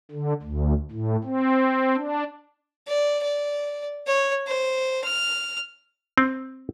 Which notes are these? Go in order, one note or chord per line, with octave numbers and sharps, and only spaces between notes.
D3
D2
A2
C4
D4
D5
D5
C#5
C5
F6
C4